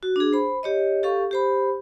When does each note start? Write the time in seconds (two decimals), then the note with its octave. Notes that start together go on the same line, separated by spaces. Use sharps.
0.03 F#4
0.16 D4 G#4
0.33 C5 B5
0.63 G4 C#5 D#5
1.03 G4 A4 F5 C#6
1.31 G4 C5 B5